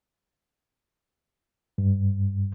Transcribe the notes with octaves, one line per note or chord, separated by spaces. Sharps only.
G2